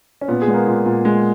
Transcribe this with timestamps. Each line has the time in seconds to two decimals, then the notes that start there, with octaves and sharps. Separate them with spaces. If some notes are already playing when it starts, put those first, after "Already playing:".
0.21 C#4
0.28 A#2 B3
0.42 G#4
0.48 G#3 B3
0.54 A#3
0.67 A#2
0.86 A#2
1.05 G#3